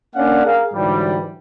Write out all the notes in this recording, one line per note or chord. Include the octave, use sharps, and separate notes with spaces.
A#3 C#4 D4 D5 F5 F#5
G#4 A#4 F5
G#2 D3 E3 F#3 G3